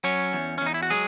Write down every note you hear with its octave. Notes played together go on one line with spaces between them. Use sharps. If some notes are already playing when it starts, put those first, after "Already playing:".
F#3 C#4 C#5
E2
C#4
E2 D#4
E4
F#4
F#3 G#3 G#4